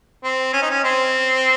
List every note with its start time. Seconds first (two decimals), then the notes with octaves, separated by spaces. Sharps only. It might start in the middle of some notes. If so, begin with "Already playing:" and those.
0.24 C4
0.53 C#4
0.62 D#4
0.70 C#4
0.84 C4